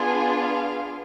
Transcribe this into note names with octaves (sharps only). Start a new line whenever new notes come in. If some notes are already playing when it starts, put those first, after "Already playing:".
Already playing: B3 D4 F4 G#4 G#5
F5